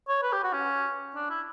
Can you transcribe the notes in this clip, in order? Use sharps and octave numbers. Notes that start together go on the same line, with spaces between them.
C#5
B4
G4
F#4
C#4
D4
E4